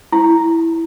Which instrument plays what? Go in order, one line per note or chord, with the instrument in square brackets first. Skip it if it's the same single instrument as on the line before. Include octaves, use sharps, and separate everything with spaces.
[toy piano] E4